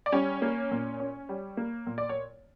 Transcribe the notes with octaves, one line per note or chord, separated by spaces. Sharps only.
D5
G3 C#4 C#5
A#3
A#2
C#4
G3
A#3
A#2
D5
C#5